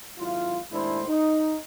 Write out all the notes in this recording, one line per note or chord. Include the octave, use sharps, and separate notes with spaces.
G#1 F#3 E4 F4
D#2 A2 G#3 D4 E4 C5
D#4